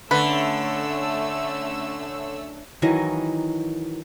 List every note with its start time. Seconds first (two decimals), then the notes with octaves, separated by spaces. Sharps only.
0.11 D3 A3 C#4 B4 E6
2.82 D#3 E3 F#3 D#5